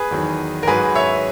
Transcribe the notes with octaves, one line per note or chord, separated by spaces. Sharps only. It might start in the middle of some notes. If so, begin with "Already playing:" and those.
Already playing: G#4 B4
E2 D#3 F#3
A#4
G#2 F#3 G#4 B4
C#5 E5